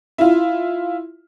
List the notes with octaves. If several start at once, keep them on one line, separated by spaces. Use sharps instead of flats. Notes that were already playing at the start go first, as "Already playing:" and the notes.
E4 F4